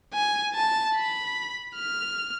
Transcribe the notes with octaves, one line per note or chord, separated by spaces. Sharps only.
G#5
A5
B5
F6